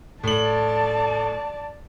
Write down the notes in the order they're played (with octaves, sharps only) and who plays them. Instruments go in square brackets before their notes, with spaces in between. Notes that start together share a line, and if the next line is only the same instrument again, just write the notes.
[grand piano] A2 F#7 [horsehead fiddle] D5 A5